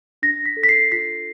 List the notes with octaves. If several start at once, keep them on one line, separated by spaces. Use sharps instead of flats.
D4 A#6
B6
A4
B6
C7
F4 B6